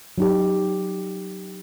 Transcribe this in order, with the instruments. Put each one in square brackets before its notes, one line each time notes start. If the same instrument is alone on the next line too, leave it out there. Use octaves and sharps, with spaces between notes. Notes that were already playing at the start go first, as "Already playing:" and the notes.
[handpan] F#3 D#4 G4